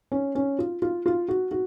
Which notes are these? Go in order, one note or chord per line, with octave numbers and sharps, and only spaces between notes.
C#4
C#4
F4
F4
F4
F#4
F#4